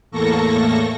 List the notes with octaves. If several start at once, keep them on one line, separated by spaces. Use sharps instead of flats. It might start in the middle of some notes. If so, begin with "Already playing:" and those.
E2 A2 A#3 A4 C#6 A#6